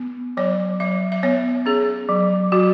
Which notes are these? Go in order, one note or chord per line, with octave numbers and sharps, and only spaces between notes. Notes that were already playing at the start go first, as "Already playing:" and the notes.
Already playing: B3
F#3 C#5
F#3 E5
E5
B3 C#5
C#4 G#4
F#3
F#3 F#4